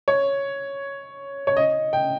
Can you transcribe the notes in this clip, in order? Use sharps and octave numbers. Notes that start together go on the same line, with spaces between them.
C#5
C#5
D#5
G5